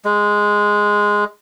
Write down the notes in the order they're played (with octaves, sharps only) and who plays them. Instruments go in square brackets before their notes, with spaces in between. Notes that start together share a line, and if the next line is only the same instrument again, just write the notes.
[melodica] G#3